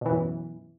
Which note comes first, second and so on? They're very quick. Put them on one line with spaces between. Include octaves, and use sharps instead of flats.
B2 E3 F#2